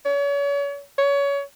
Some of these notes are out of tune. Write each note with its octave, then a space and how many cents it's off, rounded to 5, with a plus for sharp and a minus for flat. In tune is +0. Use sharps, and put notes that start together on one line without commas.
C#5 +35
C#5 +25